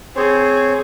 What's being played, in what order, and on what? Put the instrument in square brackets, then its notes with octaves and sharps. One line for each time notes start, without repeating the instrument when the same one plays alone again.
[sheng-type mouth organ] C4 C5 C#5 [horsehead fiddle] G#4